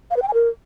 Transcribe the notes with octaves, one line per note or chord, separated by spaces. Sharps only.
F5
B4
G5
G#5
A#4